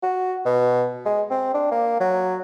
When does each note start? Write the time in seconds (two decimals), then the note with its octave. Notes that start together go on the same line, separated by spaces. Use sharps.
0.03 F#4
0.46 B2
1.06 G#3
1.31 C4
1.54 D4
1.71 A#3
2.00 F#3